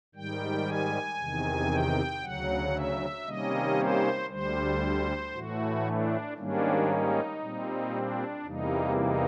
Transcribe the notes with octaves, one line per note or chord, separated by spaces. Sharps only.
G#2 D#3 G3 G5
G#5
E2 C3 D#3
G5
D2 C#3 F#3 F#5
E5
C3 D#3 G3 A#3 C#4 D#5
C5
D2 D3 G3 C5
A2 E3 A3 F#4
D4
G#2 D#3 G3 A#3 C#4 D4
D#4
A#2 G3 C4
D4
E2 C3 E3 G3 A#3 D#4
D#4